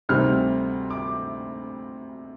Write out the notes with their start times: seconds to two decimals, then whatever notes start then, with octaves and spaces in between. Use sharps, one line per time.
0.09 D2 C3 D#3 G3 C4 F6
0.90 D6